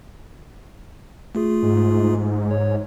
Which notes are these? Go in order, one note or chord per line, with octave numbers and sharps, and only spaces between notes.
A3 F4 G#4
G#2
C#5